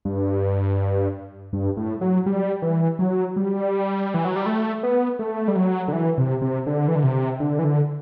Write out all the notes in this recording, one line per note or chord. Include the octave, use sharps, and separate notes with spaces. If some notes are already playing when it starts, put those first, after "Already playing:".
G2
G2
A2
F#3
G3
E3
F#3
G3
E3
F#3
G3
A3
B3
A3
G3
F#3
D3
E3
C3
C3
D3
E3
D3
C3
D3
E3
D3